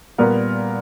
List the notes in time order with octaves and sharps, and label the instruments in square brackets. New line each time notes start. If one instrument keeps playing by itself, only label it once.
[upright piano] A#2 G3 B3 A#4